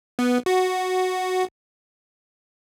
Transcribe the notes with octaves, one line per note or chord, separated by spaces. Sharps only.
B3
F#4